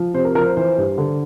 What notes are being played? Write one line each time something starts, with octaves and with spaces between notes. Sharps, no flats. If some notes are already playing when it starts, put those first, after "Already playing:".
Already playing: F3
C3 C5
A#4
F3 A#4
C5
E3 C5
G2
D3